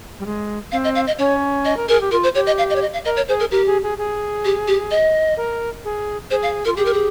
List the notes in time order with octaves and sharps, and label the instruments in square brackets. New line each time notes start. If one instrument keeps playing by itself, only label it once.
[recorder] G3
G#3
[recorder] C4 [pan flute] F5
[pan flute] D#5
F5
D#5
[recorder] C#4 [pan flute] C#5
[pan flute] D#5
[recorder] A#4
[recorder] G#4 [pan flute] A#4
[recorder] G4
[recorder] F4 [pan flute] A#4
[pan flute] C5
[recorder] G4 [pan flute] C#5
[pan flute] D#5
F5
D#5
C#5
D#5
F5
[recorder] A#4 [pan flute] D#5
[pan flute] C#5
[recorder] G#4 [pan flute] C5
[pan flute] A#4
[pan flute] G4 [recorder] A#4
[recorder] G#4
G#4
G#4
[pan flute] G4
G4
D#5
[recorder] A#4
G#4
[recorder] G#4 [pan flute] C5
[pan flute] F5
[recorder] F4 [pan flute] A#4
[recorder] G4 [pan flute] G#4
[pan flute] A#4
G#4